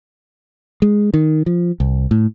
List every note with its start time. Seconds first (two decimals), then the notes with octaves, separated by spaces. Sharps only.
0.82 G#3
1.14 D#3
1.46 F3
1.80 C2
2.11 A2